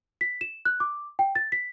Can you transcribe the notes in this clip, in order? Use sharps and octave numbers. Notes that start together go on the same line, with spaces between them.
B6
E7
F#6
D6
G5
A6
B6